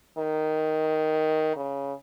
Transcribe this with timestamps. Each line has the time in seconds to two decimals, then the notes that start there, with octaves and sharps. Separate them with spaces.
0.18 D#3
1.56 C#3